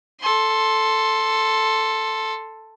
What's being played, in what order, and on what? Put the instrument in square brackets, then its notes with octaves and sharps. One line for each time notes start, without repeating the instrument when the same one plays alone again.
[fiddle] A4 C6